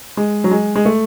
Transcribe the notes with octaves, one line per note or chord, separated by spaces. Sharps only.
G#3
F#3
G#3
G#3
A3